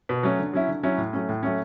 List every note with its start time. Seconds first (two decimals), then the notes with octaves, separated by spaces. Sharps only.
0.09 B2
0.23 F#3 A3 C#4
0.39 D3
0.53 F#3 C#4 E4
0.68 D3
0.83 F#3 C#4 E4
0.98 A2
1.13 F#3 A3 C#4
1.29 A2
1.43 F#3 A3 C#4